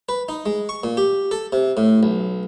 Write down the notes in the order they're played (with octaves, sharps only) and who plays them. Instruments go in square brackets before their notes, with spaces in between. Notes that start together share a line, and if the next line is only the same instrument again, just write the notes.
[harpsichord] B4
D#4
G#3
C#6
A#2
G4
A4
C3
A2
B1